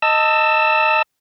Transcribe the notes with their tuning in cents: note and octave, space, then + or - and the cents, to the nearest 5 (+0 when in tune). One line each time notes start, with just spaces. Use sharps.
D#5 +0 A5 +25 E6 +0